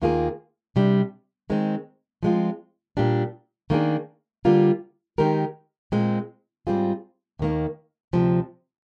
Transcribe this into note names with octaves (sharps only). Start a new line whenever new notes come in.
D#2 D#3 A#3 F4 G#4
C3 G3 D4
D#3 G#3 C4
F3 G#3 C4 F4
A#2 G3 D4 G4
D#3 A#3 D4 G#4
D3 G3 A#3 F4
D#3 G#3 D#4 G4 A#4
A#2 G#3 C4
G#2 G3 C4 F4 G#4
D#2 D#3 A#3
D2 C3 F3 C4